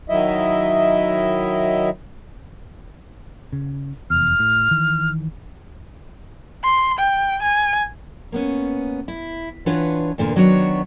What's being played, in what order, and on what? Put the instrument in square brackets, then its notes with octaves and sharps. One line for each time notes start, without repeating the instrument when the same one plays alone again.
[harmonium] D#3 F#3 E4 D#5 E5
[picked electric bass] C#3
[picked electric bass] F1 E2 [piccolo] F6
[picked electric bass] A2
D#3 E3
[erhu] C6
G5
G#5
[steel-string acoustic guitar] A#3 B3 C#4
E4
E3 D4 F4 B4 C#5 F#5
E2 A#2 D3 A#3
D#3 F#3 B3 D4 E4 C#5